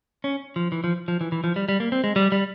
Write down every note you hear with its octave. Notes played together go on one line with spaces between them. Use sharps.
C#4
F3
E3
F3
F3
E3
E3
F3
G3
G3
A#3
C4
G#3
G3
G3